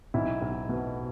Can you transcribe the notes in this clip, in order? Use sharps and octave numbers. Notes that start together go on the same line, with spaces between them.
B1 E4
B1
B2